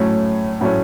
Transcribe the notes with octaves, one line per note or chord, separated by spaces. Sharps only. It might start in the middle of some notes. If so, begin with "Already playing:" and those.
Already playing: A2 F#3 A3 C#4
A2 F#3 A3 C#4